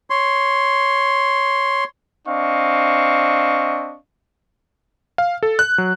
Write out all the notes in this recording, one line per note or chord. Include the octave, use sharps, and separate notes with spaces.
C#5 C6
C4 D4 D#5 F5 C#6
F5
A4
F#6
F#3